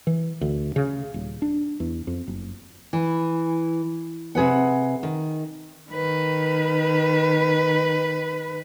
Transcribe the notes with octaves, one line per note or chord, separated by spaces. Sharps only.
E3
D2
C#3
D#1
D4
E2
F2
F#1
E3
C3 G#4 B4 F#5
D#3
D#3 B4